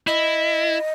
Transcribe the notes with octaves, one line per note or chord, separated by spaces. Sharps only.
E4 D#5